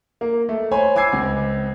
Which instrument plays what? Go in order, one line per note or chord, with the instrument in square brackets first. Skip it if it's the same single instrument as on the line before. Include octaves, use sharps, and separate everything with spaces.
[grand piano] A#3
A3
C5 C#5 G#5 B5
G#5 D6 E6 G#6 C7
C#2 C4